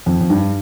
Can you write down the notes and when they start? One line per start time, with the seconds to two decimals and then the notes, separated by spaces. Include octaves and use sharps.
0.06 F2
0.21 F2
0.30 G2